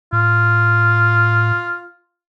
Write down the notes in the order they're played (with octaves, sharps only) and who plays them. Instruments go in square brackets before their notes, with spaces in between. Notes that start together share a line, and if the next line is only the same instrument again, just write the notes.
[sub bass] A2 [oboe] F4